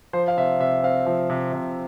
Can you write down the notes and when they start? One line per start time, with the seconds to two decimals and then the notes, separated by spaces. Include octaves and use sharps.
0.13 F3 C5
0.28 F5
0.37 C3 E5
0.60 C3 E5
0.83 C4 F5
1.06 F3
1.30 C3
1.53 C3